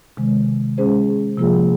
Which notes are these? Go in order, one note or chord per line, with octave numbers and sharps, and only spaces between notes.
C3 D#3 G#3
G#3 C#4 G#4 C5
C3 F3 A#3 F4 G#4